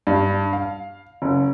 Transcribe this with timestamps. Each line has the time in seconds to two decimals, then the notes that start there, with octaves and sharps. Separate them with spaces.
0.07 G2
0.53 F5
1.22 F#1